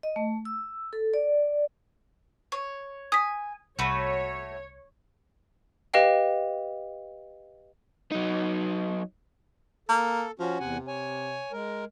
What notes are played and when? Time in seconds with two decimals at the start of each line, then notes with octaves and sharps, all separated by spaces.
0.03 D#5
0.16 A3
0.45 E6
0.93 A4
1.14 D5
2.52 C#5
3.12 G#5 D#6 B6
3.79 C2 A3 F#4 C#5 B5
5.94 G4 B4 D#5 F5 G5
8.12 F#3 D#4
9.89 A#3 A4
10.39 F3 C#4 F#4
10.60 E2 C3 F#5 G#5
10.88 C#5 G#5
11.52 G#3 A#4